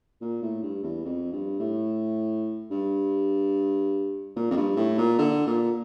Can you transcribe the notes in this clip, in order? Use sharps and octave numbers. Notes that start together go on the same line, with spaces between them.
A#2
A2
G2
E2
F2
G2
A2
G2
A#2
F2
G2
A2
A#2
D3
A#2